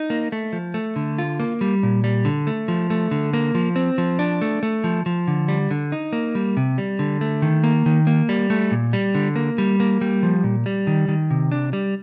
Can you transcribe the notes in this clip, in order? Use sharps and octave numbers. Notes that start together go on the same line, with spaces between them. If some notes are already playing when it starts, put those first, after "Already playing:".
Already playing: D#4
A#3
A3
F3
A3
D3
F4
A#3
G3
A#2
G3
D3
A3
F3
A3
D3
A#3
F3
C4
F3
D4
A3
A3
F3
F3
D3
G3
D3
D#4
A#3
G3
C3
G3
D3
A3
D#3
A#3
D#3
A#3
G3
A3
A#2
G3
D3
A#3
G3
A#3
G3
F3
A#2
G3
D#3
D#3
C3
D4
G3